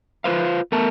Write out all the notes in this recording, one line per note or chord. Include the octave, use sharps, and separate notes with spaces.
F4 B4 C5 F5
A3 B3 A#4 A5